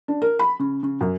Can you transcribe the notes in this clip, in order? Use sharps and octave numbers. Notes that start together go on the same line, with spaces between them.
D4
A#4
B5
C#3
C#3
F#2